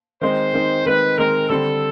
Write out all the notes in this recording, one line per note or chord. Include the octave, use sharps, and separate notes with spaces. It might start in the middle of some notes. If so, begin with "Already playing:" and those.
D#3 G#3 C4 D#4 C5
D#3 G#3 C4 D#4
D#3 G#3 C4 D#4 B4
D#3 G#3 C4 D#4 A#4
D3 G3 C4 A4